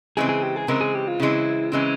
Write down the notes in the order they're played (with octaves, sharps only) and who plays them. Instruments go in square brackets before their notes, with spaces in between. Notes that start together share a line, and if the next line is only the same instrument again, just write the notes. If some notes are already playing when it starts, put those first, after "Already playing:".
[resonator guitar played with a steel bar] C#3 E3 G#3 C4 [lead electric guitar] G#4
[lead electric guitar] G#4
G4
G#4
[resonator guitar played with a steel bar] C#3 E3 G#3 C4 [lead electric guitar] A#4
[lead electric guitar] G#4
G4
F4
[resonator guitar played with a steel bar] C#3 E3 G#3 C4 [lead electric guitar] E4
[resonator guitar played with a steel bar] C#3 E3 G#3 C4 [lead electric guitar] C#4